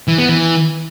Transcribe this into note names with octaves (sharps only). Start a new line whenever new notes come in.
E3
B3
E3